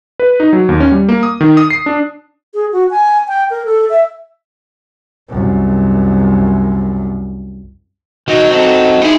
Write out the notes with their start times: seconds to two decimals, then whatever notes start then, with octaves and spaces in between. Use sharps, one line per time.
0.20 B4
0.40 D#4
0.53 F#3
0.69 D#2
0.80 C#4
0.92 G3
1.09 A#3
1.23 D#6
1.41 D#3
1.57 D#6
1.70 C7
1.86 D4
2.54 G#4
2.72 F#4
2.91 G#5
3.28 G5
3.50 A#4
3.66 A4
3.90 E5
5.29 C2 F#2
8.28 D#3 F#3 D#4 F#4
8.51 C4 D#4 A4
9.02 D#4 E4 G#4 B5